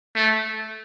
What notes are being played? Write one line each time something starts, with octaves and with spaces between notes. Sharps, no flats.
A3